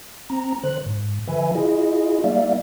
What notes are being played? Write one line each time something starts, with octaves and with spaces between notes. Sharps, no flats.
C4 A#5
D3 C5 F#6
G#2
D3 F3 B4 E5 G#5
E4 F4 G#4 D#5
G3 A#3 D#4 D5 E5 F5